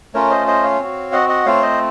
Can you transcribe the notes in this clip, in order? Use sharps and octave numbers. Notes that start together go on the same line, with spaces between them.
A3 C#4 F4 A#4 C#5
C5 D#5
C5 D#5
C#5 F5
C4 F#4
D#5 F#5
D#5 F#5
A3 C4 F4 C#5 F5
C5 D#5